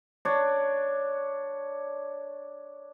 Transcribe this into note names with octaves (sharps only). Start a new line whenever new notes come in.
D4 C#5